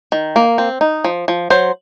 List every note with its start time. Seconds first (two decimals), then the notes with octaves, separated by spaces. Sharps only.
0.12 D#3
0.36 A#3
0.58 C4
0.81 D#4
1.05 F3
1.28 F3
1.50 F#3 C5